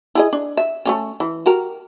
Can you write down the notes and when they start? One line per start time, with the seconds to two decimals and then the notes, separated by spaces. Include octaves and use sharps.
0.15 E4 G#4 D#5
0.33 D4
0.57 E5
0.85 A3 A#3 C#4
1.20 E3
1.46 F#4 G4 A#4